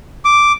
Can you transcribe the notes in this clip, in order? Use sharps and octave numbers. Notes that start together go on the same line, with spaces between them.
D6